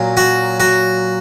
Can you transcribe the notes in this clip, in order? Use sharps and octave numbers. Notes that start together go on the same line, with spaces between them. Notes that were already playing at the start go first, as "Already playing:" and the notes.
Already playing: A#2 F#3
F#4
F#4